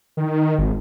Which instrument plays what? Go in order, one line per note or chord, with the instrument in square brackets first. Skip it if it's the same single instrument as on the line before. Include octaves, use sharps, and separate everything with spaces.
[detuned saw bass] D#3
G#1